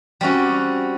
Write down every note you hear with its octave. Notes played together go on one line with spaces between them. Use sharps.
G3 C4 C#4 F#4